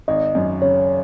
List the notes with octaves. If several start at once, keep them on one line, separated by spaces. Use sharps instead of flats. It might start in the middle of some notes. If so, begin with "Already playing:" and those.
G#1 D#5
F#2
C#3 C#5